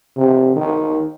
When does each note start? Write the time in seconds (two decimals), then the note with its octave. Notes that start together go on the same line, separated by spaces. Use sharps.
0.17 C3
0.56 D#3